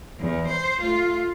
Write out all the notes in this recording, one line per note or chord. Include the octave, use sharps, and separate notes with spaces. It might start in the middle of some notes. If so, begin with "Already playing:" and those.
E2
C5
A3 F4